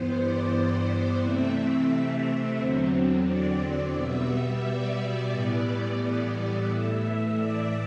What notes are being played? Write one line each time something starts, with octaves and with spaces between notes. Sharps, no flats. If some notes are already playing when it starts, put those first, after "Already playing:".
Already playing: G2 E3 B3 C5
D5
D5
C3 E3 A3 C4 E5
E2 D3 F#3 C4
D5
B2 G3 B3 E5
D5
A2 E3 G3 B3
D5
D5
A2 E3 A3 E5
D5